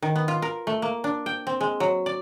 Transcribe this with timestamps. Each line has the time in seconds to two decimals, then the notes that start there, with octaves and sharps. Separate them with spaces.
0.02 D#3
0.15 B3
0.28 F4
0.42 A#4
0.67 A3
0.82 A#3
1.04 D4
1.26 G5
1.47 C4
1.61 G#3
1.80 F#3
2.06 D5